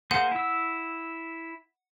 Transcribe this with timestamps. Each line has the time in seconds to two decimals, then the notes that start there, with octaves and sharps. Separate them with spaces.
0.11 A#3 G#4 C5 F#5
0.32 E4 E6